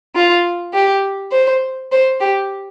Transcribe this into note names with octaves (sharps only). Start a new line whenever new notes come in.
F4
G4
C5
C5
G4